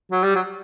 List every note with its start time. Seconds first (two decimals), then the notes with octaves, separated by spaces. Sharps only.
0.12 F#3
0.23 G3
0.35 F#3